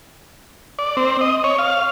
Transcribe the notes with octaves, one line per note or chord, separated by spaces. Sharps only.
D5
C4
D#5
C#5
F5